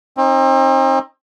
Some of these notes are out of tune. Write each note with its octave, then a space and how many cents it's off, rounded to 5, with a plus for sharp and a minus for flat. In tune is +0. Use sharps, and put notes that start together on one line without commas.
C4 +35 D#4 +0